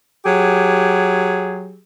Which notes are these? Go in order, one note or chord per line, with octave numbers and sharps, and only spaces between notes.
F#3 G4 G#4